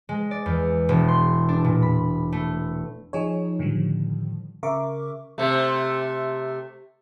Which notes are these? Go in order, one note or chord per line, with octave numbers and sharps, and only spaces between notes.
G#3
D5
E2
E1
C6
D4
A#2
B5
A3
F3 D#4 G#4 C#5
A2 D3 D#3 F3 G3
C#3 A#4 E5 C#6 D6
C3 A3